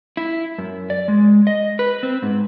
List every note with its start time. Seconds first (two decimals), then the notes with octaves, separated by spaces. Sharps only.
0.17 E4
0.58 F#2
0.90 D5
1.08 G#3
1.47 D#5
1.79 B4
2.03 C4
2.23 G#2